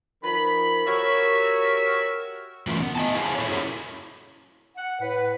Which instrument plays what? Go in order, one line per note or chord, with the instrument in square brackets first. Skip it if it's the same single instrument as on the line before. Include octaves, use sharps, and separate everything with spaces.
[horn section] D#3 F3 B5
F#4 G4 A#4 C#5 E5
[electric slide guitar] E3 F#3 A3 C#4 F4 A#4
B3
D#5 G#5 A5
E4 G#4 C5 F5 G#5
A4 C#5
C#4 E4 F#4 G#4 A#4
[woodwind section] F#5
A2 B4